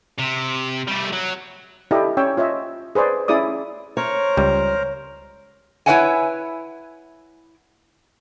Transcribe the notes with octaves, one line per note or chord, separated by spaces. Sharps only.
C3
G3 A3
F#3
E4 G4 A4 D5 D#5
C#4 C#5 G5 E6
F4 C#5 D#5 E5
G#4 B4 C5 D5
C#4 E4 G#4 D5 D#6
A#4 C5 C#5 A#5
C#2 G3
E4 B4 C#5 E5 F#5 G#5